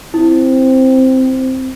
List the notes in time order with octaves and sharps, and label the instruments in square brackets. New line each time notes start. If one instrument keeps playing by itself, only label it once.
[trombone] C4 [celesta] E4